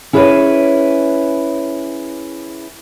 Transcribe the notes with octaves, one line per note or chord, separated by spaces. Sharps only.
C#4 E4 G#4 A#4 B4 C#5